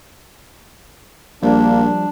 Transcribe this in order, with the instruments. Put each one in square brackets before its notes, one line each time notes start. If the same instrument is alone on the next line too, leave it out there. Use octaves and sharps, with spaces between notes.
[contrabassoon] A#1 [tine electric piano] F3 G3 [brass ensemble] A#3 [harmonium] D4